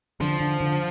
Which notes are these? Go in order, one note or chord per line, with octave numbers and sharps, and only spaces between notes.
D3 F3
D3
D3